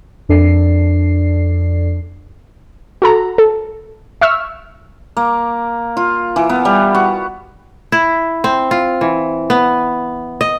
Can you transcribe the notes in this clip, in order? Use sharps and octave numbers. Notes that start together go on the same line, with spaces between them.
F2 D4 A4 D5 C7
F#4 A4 A#5
A4
E5 C#6 E6 F6
A#3
F4
E3
B3
G3
F#4
E4
C4
F4
E3
B3
D#5